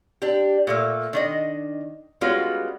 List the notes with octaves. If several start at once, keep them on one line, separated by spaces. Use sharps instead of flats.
D4 G4
A#2 A3 A#3
D#3 D4 D#5
G3 G#3 B3 C#4 F4 F#4